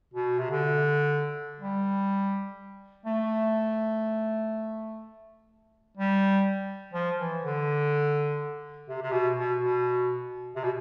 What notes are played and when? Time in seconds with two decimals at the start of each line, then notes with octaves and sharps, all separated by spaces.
0.14 B2
0.39 C3
0.51 D3
1.60 G3
3.05 A3
5.97 G3
6.94 F3
7.19 E3
7.43 D3
8.89 C3
9.02 C3
9.12 B2
9.38 B2
9.62 B2
10.56 C3
10.64 B2